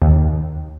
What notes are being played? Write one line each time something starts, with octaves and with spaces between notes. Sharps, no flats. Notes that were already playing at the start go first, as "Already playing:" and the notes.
D#2